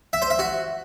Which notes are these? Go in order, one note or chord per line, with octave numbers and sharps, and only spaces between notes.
E5
C5
E5
F#4